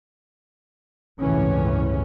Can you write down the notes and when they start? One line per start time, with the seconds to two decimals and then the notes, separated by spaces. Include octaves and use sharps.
1.20 G1 C#2 A2 C3 E3 C#4